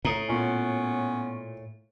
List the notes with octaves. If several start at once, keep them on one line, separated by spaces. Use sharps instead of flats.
A2 A#5 D#6
A#2 B3 C#4